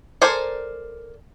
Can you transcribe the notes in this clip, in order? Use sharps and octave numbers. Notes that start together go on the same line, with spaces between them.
A4 A#4 C5 D5 G#5